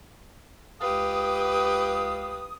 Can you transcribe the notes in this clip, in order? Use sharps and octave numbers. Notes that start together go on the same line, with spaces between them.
C#2 G4 B4 F5 D#6